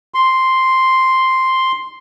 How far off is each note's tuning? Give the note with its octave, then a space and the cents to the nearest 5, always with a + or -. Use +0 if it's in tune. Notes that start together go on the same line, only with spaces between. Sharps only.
C6 +0